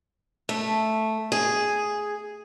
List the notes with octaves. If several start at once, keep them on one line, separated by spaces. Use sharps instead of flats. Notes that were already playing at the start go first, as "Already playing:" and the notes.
A3
G#4